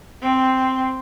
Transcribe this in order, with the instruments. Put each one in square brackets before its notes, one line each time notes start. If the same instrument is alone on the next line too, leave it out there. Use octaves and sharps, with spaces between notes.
[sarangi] C4